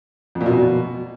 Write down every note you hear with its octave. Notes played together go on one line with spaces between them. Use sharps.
F2
A#2
B2